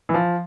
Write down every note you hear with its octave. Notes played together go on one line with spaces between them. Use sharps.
E3
F3